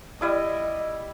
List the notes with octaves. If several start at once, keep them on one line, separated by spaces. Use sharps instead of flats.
G3 E4 D#5 D#6